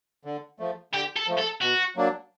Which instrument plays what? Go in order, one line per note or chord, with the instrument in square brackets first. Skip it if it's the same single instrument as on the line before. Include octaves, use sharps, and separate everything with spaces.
[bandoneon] D3
F3 A3
[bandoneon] D3 [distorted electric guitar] G4
[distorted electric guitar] A4
[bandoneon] F3 A3
[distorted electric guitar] A4
[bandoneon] B2 [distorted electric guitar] F#4
[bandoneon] F#3 A#3 D4